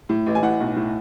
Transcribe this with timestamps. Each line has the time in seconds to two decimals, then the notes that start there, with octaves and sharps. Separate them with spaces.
0.09 A2
0.26 A1
0.35 G#5
0.42 A2 F#5
0.60 B1
0.76 A2